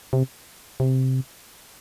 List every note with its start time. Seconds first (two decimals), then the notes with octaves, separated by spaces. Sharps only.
0.13 C3
0.80 C3